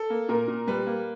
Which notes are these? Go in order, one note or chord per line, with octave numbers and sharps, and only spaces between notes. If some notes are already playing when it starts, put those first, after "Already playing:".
Already playing: A4
A#3
A#2 A#4
A#2
G3 B4
A#3